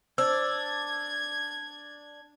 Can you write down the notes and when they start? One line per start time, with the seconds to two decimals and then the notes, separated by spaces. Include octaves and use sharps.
0.18 D4 C5 E6 G#6